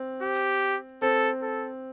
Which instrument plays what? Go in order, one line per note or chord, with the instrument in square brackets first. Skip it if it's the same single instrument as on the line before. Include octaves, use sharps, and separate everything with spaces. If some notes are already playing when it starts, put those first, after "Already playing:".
Already playing: [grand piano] C4
[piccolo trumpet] G4
[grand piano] C4 [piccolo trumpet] A4
[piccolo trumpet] A4